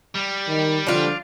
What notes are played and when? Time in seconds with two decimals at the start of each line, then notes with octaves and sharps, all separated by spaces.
0.15 G3
0.48 D#3
0.87 D3 F3 D4 F4